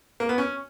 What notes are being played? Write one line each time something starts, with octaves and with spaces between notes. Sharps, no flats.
A#3
B3
C#4